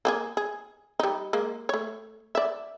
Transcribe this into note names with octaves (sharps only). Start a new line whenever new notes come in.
A#3 G4 G#4
G#4
G3 D#4
G#3 A#3
A3 C#5
D5 E5